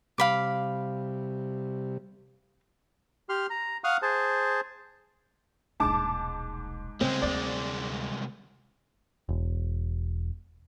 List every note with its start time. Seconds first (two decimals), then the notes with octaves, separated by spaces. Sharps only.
0.18 C3 G3 F5 B5 D6
3.29 G4 C6 F6
3.50 A#5
3.84 F5 F#5 C#6 D#6 F6
4.02 G#4 C5 A5
5.80 D#1 B1 G#2 A5 D6
7.01 C2 C#3 G#3 C4
7.22 D2 A#3 D5
9.29 E1